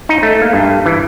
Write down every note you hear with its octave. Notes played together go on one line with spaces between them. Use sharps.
D#4
A3
A#3
G2
E3